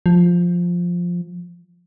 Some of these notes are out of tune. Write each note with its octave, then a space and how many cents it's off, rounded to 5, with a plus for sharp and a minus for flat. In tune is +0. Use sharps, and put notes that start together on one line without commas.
F3 +5